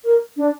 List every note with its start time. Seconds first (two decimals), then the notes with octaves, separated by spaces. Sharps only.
0.04 A#4
0.37 D4